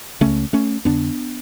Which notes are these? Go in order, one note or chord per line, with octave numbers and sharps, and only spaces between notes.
C#2 C#3 A3 C#4
A3 C#4
F2 D3 B3 D4